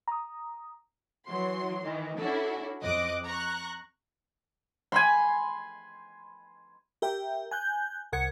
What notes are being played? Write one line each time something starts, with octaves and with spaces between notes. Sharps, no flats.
A#5 D#6
E3 F#3 C6
D#3 E3
C#4 D4 E4 F#4 A4
F2 D#5 D6 F#6
A#5 C#6 F#6
G#5 B5 C6
G4 A#4 E5 G5
G#5 F#6 G6
C2 A#4 F#5 G#6 C#7